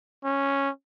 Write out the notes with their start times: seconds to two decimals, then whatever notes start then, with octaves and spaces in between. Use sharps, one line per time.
0.25 C#4